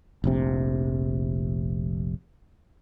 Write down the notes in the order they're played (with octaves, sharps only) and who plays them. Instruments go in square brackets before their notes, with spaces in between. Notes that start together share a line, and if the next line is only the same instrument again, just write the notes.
[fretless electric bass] F1 A#1 C3